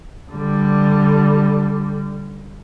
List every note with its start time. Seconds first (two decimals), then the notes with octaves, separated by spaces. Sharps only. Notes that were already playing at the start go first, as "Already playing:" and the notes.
0.30 D3 G3